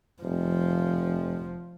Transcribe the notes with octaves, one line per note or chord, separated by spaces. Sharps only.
F1 F3